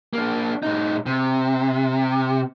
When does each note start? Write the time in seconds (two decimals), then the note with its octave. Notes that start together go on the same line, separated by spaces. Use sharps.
0.13 A#3 D4
0.63 A2 D#4
1.06 C3